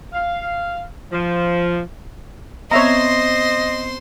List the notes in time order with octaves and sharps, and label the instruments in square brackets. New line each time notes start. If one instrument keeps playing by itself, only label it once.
[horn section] F5
F3
[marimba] B3 C4 [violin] C5 C6 [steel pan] C#5 E5 A#5 [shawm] D#5